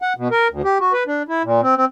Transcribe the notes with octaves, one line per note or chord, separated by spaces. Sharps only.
F#5
B2
A#4
D2
G4
F#4
B4
D4
E4
A#2
C4
C4